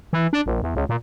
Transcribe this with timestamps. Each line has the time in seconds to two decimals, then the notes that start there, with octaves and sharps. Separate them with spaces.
0.13 E3
0.33 D4
0.46 A#1
0.63 E2
0.75 C#2
0.89 A#2